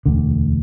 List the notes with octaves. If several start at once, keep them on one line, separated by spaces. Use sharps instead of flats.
E1 D2 D3